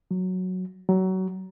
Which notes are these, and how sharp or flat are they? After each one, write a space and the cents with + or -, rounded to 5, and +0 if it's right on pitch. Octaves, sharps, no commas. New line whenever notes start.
F#3 -5
F#3 +25